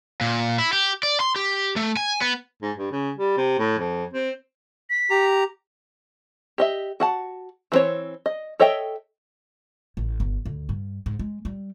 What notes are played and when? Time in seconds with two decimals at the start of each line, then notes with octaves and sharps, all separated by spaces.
0.21 A#2
0.59 E4
0.73 G4
1.03 D5
1.20 C6
1.36 G4
1.76 A3
1.97 G#5
2.21 B3
2.62 G#2
2.78 G2
2.92 C#3
3.17 G3
3.37 C3
3.59 A2
3.78 F2
4.14 C4
4.90 B6
5.10 G4 A#5
6.58 G4 D#5 E5
7.00 F#4 F#5 A5
7.72 E3 B3 C4 C5 C#5
8.26 D#5
8.60 A4 C#5 D#5 E5 G5
9.97 A1
10.20 G1
10.45 D2
10.69 G2
11.06 G#2
11.19 G#3
11.45 G3